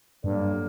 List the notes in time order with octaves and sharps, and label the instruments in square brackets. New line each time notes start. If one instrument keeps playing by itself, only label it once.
[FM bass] G2 [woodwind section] D3 F#3 A#3